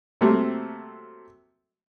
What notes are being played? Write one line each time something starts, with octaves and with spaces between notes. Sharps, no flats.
C3 F#3 A3 A#3 C4